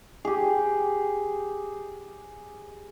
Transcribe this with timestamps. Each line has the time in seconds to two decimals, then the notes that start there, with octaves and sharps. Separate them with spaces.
0.25 G4 G#4